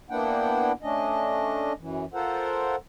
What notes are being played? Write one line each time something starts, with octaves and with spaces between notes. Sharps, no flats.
A#3 B3 D4 E4 F#5 G5
A3 C#4 D4 D#5
F#2 E3
F4 A4 A#4 C5 F#5